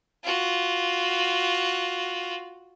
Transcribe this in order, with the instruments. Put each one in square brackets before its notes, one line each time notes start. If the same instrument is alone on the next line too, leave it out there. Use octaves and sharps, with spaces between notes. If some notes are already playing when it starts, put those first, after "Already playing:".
[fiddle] F4 F#4